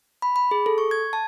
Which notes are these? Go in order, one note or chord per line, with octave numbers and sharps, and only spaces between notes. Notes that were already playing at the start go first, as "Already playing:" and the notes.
B5
B5
G#4
A4
C#6
G#6
A5